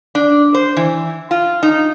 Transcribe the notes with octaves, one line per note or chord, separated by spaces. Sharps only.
D4
C5
E3
F4
D#4